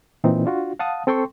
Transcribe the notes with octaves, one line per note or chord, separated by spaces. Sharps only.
A#2 E3 C4 D#4
D4 F4 F#4
F5 F#5 A5 D#6
C4 A4 G5 C6 C#6